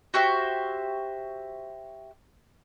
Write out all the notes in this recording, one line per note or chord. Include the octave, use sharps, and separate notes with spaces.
F#4 G4 C5 E5